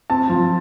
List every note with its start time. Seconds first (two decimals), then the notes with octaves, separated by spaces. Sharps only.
0.10 C4 A5
0.30 F3